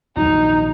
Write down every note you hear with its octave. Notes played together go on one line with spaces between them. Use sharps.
A#1 G#2 D#3 F#3 D#4